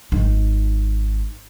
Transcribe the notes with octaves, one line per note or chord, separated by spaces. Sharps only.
G#1 D#4